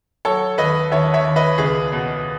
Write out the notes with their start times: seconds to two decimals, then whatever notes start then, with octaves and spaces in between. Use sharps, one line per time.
0.25 F#3 A4 C#5
0.58 D#2 B4 D#5
0.91 D#2 C#5 E5
1.14 C#5 E5
1.25 D#2
1.36 B4 D#5
1.58 C#2 G#4 B4
1.92 B2